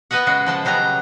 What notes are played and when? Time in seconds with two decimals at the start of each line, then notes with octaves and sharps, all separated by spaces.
0.11 B3 B4 D#5 E5 F#5
0.27 C#3 G#3 F#4
0.46 F3 G#3 A5
0.65 C#3 F#3 G3 B3 A#5